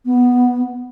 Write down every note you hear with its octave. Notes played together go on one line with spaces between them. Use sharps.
B3